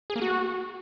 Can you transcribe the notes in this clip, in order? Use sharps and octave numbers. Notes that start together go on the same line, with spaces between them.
G#4
A#3
F#4